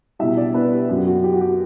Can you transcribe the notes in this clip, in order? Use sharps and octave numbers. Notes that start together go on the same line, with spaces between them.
B2 G3 E4 E5
D4 D5
B3 B4
G4
F#2 F#3 G4
F#4
G4
F#4
G4